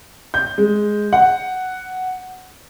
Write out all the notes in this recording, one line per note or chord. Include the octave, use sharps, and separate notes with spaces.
G6
G#3
F#5